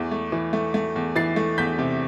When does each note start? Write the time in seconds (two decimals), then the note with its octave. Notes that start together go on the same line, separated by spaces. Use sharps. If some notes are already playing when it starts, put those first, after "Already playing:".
Already playing: E2 E3 A3
0.11 A3
0.32 E3
0.53 A3
0.74 A3
0.96 E2
1.16 E3 A6 C7
1.36 A3
1.58 E2 G6 B6
1.79 C3